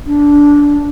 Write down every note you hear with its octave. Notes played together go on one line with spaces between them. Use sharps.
D4